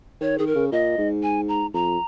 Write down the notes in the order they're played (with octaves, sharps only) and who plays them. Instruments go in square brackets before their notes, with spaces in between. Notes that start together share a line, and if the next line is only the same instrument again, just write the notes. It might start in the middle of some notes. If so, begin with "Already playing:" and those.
[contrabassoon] D#3 [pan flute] C#5
[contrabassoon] D#3 [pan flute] G#4
[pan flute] A#4
[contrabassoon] C#3
[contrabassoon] A#2 [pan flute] D#5
[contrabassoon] G#2
[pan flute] G#5
A#5
[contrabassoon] F2 [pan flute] A#5